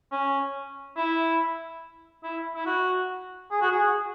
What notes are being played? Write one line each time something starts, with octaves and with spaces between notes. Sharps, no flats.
C#4
E4
E4
E4
F#4
G#4
F#4
G#4